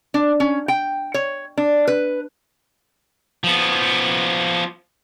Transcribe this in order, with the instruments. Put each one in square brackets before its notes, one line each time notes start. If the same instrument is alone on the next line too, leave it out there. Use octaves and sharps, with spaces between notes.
[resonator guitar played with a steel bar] D4
C#4
G5
C#5
D4
B4
[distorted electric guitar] F3 B3